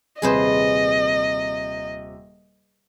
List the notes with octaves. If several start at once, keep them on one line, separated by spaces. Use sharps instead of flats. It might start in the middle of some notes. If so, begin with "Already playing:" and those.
D#1 C3 G#4 B4 C5 D#5 C6